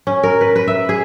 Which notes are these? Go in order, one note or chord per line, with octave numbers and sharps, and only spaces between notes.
C#4
A#4
B4
B4
E5
G#4